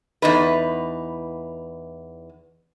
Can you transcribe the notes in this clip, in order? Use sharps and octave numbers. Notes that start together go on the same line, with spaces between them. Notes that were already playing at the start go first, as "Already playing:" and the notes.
E2 D#4 B4